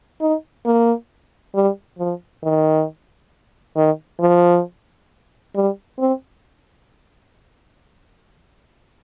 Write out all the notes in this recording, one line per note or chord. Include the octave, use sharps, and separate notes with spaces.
D#4
A#3
G3
F3
D#3
D#3
F3
G3
C4